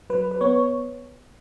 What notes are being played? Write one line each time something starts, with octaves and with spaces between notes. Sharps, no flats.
F#3 B4
B4
B3 C#5